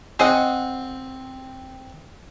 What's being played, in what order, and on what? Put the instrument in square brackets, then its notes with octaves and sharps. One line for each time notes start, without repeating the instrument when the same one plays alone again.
[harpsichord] C4 [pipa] G#4 D#5 F#5